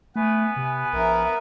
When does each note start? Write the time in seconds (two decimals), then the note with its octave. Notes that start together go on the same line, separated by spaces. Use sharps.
0.16 A3 B3 B4 G#5
0.57 C3
0.93 A#1 A#4 E5